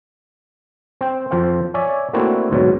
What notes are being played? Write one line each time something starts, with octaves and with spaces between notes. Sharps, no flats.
C4 G5
F2 F3 C5 F5 G5
C#5 D5 E5 G#5
A3 A#3 C4 D4 E4 F#4
D2 G#2 B2 F#3 C#5